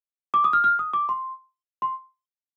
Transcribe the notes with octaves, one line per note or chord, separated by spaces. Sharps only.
D6
D#6
F6
F6
D#6
D6
C6
C6